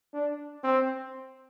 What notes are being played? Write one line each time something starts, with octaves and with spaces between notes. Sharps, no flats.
D4
C4